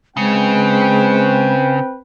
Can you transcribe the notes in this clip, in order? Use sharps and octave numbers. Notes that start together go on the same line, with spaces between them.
C#3 G#3 C4 B4 G5